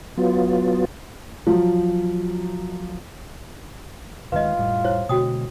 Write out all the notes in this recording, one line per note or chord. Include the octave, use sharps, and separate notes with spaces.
F#3 B3 F4
F3 F#3
D1 D#3 G#3 F4 B4 D#5
F1 A2 G3
E4 C5 C#5
B2 D3 G#3 F#4 G5 D#6